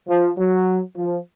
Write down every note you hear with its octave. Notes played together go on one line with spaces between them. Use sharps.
F3
F#3
F3